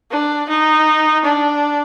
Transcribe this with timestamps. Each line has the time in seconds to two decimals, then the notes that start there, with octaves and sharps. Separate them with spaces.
0.11 D4
0.49 D#4
1.25 D4